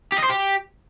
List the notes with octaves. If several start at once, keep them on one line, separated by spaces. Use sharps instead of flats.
G4
D#5
C5
G4